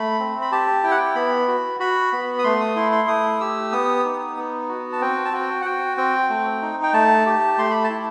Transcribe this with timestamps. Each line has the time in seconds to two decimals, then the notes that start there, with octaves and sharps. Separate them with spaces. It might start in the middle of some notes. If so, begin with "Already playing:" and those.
Already playing: A3 B5
0.20 C4
0.42 B5
0.52 G4 A5
0.83 E4 G5
0.91 F#5
0.98 G5
1.15 B3 B5
1.48 F#4
1.80 F#4 B5
2.13 B3
2.39 D#6
2.44 A3 C6
2.60 D#6
2.76 E4 C6
2.92 C6
3.08 A3 D#6
3.40 G4 E6
3.72 B3 D#6
4.05 D#4
4.37 B3
4.69 F#4
4.93 A5
5.01 C4 G5
5.25 A5
5.33 F#4 G5
5.62 F#5
5.65 F#4 G5
5.97 C4 G5
6.29 A3
6.62 D#4
6.83 G5
6.94 A3 A5
7.26 G4
7.58 A3 C6
7.71 B5
7.84 A5
7.90 E4